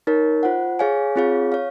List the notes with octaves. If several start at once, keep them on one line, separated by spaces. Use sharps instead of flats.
D#4 A#4 C#5
F4 C5 F#5
G#4 C#5 F5 G#5
C4 F4 G#4 C#5 F5
C#5 F5